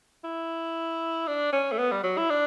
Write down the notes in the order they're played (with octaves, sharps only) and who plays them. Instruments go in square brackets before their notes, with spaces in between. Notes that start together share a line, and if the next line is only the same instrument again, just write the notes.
[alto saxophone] E4
D4
C#4
A3
B3
G3
F#3
E4
D4